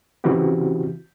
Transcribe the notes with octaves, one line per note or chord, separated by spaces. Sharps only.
C#3 E3 C4 E4 F#4 G4